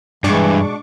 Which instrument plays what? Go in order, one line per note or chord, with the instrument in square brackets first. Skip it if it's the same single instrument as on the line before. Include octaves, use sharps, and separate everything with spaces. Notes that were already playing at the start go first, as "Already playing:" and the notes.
[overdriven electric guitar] G2 [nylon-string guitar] B2 G#3 [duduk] E3 [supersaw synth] D4 C#6 D6